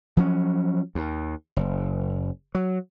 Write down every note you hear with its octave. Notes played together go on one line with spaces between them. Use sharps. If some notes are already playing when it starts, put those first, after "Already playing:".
F3 F#3 C#4
D#2
F#1
F#3